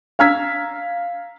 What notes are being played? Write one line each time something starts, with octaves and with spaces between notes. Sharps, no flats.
F5 A#5 E6 F6 G#6 B6